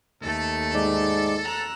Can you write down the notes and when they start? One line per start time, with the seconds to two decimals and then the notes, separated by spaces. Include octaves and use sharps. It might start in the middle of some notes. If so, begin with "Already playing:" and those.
0.22 D#2 A3 A4
0.74 G#2 D5
1.42 A#5 E6 F#6